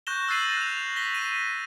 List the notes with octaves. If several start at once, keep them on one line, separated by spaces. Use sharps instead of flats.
C#6 F#6 G6 A#6 E7 G7
E6 F#6 A6 C7 D#7 F#7
F#6 F7
A#6 B6 G7
D#7